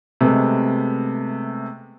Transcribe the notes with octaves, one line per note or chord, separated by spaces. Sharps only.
C3 G#3 A3 B3